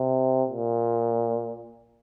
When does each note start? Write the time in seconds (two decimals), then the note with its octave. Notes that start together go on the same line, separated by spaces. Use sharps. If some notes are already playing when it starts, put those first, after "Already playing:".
Already playing: C3
0.50 A#2